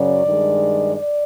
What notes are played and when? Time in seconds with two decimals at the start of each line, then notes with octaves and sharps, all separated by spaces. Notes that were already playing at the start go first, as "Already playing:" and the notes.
Already playing: F#2 C#3 F#3 D5
0.25 G2 D#3 G#3
0.95 D5